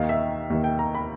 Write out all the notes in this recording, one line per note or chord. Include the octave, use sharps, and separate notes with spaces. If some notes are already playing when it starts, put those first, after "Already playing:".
Already playing: D#2 D#3 F5
E5
D#2 D#3
G5
A#5
B5